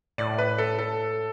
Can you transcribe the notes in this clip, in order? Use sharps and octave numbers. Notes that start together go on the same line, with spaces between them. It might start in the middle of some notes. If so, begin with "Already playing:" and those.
A2 D5
B4
A4
A4